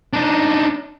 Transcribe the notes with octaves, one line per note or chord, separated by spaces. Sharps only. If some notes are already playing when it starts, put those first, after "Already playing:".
D4 D#4